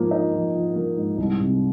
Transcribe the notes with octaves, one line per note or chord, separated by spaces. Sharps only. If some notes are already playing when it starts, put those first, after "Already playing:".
Already playing: G#2 F3 A#3
D#4
F3
F3
A#3
G#2
C2
C3